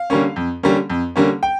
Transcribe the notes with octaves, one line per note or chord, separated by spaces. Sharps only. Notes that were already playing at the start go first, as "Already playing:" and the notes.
Already playing: F5
D3 G3 A#3 C#4
F2
D3 G3 A#3 C#4
F2
D3 G3 A#3 C#4
G5